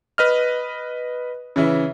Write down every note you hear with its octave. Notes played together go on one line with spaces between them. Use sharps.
B4 D#5 F6
C#3 E3 E4